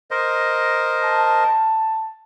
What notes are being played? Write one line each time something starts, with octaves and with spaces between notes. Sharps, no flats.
A#4 C5 D#5
A5